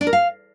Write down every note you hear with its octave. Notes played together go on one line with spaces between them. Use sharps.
D4
A#4
F5